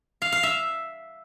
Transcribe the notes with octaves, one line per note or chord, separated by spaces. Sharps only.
F5
F5
E5